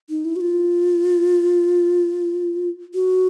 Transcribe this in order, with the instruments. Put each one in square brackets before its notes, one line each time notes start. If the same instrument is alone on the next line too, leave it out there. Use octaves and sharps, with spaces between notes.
[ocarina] D#4
E4
F#4
F4
F#4